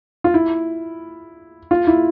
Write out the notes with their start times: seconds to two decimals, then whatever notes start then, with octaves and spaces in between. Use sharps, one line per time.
0.24 F4
0.34 E4
1.71 F4
1.87 E4